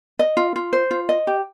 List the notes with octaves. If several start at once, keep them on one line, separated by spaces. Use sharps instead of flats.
D#5
F4
F4
C5
F4
D#5
G4